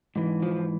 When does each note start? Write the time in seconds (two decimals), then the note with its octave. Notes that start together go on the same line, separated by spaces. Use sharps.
0.16 G#2 E3
0.42 F3